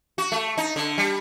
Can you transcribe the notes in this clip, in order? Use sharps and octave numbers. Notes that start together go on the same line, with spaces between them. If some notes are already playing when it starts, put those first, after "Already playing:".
F#4
A3
D#4
D3
G3